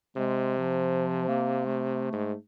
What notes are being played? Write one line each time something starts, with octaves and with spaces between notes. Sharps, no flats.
C3 G#3
F3
A#3
A3
G#2